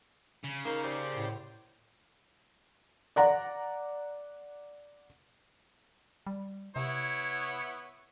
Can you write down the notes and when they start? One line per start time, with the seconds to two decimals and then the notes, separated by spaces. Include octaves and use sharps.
0.44 C#3
0.65 A#3 D#4 A#4 C5 F5
0.84 C4 G4 C5 D5
1.14 A2
3.16 D5 F#5 A#5
6.27 G3
6.76 C3 B3 E4 C#5